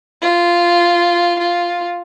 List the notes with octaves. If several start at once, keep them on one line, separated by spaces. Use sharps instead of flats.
F4
F4